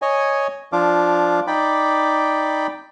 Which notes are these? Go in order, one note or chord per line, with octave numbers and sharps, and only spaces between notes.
C#5 D#5 G#5
F3 D4 F4 F5 D6
D#4 D5 G5 B5 D6